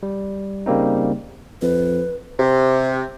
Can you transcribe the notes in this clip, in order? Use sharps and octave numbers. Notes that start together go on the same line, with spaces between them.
G3
C#3 G3 A#3 C4 D#4
F2 B4
C3